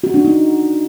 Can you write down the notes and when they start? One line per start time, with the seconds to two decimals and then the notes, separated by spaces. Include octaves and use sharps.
0.04 F#4
0.14 D4
0.25 D#4